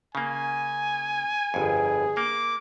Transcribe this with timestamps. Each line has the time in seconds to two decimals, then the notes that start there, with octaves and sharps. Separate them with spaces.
0.15 C#3 A#3 G#5
1.54 G1 F2 G#4
2.17 A#3 D6